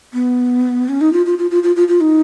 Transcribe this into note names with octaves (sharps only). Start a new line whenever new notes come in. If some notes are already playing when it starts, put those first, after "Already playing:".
B3
C#4
D#4
F4
F4
F4
F4
F4
F4
F4
D#4